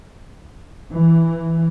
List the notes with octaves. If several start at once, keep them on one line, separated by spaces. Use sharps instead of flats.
E3